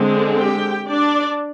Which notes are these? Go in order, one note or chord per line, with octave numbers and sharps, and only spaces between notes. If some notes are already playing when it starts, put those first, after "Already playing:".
Already playing: D3 G#3 C4
G4 G5
D4 D5